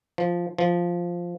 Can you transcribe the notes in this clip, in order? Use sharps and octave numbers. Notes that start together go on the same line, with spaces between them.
F3
F3